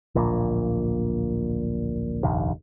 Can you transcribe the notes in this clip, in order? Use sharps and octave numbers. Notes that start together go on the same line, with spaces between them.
D1 A#1 A#2
F1 A#1 D#2